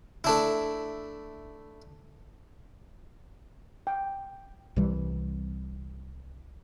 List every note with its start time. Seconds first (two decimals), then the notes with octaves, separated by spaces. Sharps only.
0.24 A3 D4 E4
3.87 G5
4.76 C2 C3 E3 G3